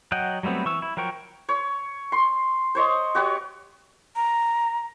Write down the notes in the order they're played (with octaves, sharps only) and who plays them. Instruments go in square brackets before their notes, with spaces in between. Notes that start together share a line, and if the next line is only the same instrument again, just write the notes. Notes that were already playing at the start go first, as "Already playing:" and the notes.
[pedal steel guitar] F#3 D#5 F#5 G5
F#3 G3 A3 B3 C4
E3 C#6 E6
E4
F3 F#3 A#4 G5 C#6
[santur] C#5
C6
C5 C#5 D#5
F#4 G4 B4 C#5
[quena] A#5